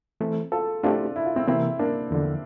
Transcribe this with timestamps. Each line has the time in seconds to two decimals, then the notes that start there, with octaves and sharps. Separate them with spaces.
0.21 E3 A3 C4
0.52 F4 A4
0.83 A3 C4 D4 E4 F4 G4
1.16 E4
1.26 F4
1.36 C4 E4
1.47 C3 E3 A#3 C4 E4
1.79 A#3 D4
2.11 E2 D3 F3